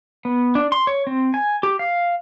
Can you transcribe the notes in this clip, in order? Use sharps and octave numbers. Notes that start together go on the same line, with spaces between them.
B3
D4
C6
C#5
C4
G#5
G4
F5